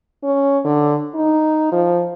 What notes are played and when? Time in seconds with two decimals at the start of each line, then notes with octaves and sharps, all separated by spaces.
0.24 C#4
0.65 D3
1.15 D#4
1.72 F3